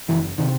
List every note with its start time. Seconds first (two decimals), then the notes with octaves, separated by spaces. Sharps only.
0.08 F#1 E3
0.38 C3 D#3